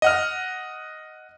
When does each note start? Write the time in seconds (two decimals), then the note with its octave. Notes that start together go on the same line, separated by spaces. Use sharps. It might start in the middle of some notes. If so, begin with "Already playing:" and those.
0.02 D#5 F#5 F6